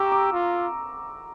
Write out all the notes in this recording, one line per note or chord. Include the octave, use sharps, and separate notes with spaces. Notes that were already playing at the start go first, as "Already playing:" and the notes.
Already playing: G4 A#5 C#6 D6 E6
D6
F4